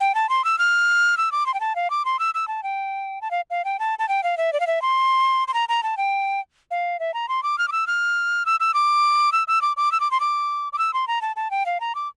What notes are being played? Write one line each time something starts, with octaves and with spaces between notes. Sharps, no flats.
G5
A5
C6
E6
F6
E6
D6
C6
G5
A5
F5
D6
C6
E6
E6
A5
G5
A5
F5
F5
G5
A5
A5
G5
F5
E5
D5
F5
E5
C6
C6
A#5
A#5
A5
G5
F5
E5
A#5
C6
D6
F6
D6
E6
F6
E6
E6
D6
E6
E6
D6
D6
E6
D6
C6
D6
D6
E6
C6
A#5
A5
A5
G5
F5
A#5
D6